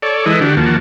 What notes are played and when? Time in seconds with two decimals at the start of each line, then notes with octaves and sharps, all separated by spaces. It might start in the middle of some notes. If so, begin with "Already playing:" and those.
0.02 A4 C#5 D5
0.26 E3 G#3 E4 A4 B4 D#5
0.41 D3 D4 F#4 G4
0.57 D#2 F3 A#3 F#4 A5